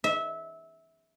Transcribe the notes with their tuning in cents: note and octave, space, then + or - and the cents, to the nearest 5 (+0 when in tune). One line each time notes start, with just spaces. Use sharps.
E5 -20